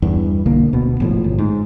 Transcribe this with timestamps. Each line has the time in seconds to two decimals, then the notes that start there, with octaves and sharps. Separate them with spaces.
0.02 E2 G2 E3
0.46 B1 D3 A#3
0.73 D1 B2
1.00 G#1 A2 F3
1.24 G1
1.38 G#2